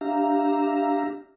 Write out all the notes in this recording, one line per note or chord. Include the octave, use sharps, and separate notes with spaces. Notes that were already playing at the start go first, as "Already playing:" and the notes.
D4 G4 E5 F5 A#5